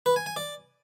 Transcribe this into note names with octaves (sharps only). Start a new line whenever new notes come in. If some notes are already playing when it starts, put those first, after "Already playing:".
B4
G#5
G#5
D5